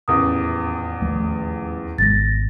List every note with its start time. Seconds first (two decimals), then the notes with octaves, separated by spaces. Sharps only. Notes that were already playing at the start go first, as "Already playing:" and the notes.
0.08 D#1 A1 E2 D#6
1.01 D#2 F3 A3
1.98 G#1 B2 G#3 A6 A#6